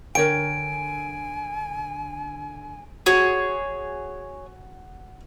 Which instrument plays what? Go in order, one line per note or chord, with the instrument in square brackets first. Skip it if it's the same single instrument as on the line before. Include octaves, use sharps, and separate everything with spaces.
[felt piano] D3 [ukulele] A#4 C#5 G5 [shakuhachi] G#5 [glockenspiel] D7
[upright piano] F#4 [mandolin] G#4 C#5